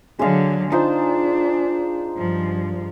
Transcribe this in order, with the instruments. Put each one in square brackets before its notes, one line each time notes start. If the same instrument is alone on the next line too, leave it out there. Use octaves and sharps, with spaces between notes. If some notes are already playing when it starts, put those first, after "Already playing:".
[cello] D3 F#3 [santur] G#3 F5
[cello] D4 [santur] D#4 F4 C5
[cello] G2 F3